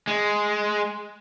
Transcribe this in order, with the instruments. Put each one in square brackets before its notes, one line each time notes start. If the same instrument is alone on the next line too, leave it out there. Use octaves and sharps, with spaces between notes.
[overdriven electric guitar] G#3